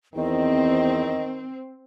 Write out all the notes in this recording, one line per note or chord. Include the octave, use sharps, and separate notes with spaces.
E2 D#3 C4 D#5